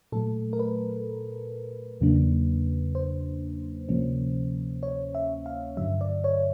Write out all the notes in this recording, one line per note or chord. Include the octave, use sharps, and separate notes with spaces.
A#2 F#3 A3 A4
A#4
B4
E2 C#3 F#3 A#3 D4
C5
D2 C3 F3 A#3 C#4
C#5
E5
F5
G2 D3 F#3 E5
D5
C#5